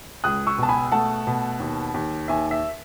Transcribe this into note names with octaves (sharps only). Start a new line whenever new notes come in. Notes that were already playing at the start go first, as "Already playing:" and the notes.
C#2 D#6 F#6
C#6 E6
B2 A5
G#5 B5
A3 F#5 A5
B2
D#2
D#2
D#2 E5 G#5
E5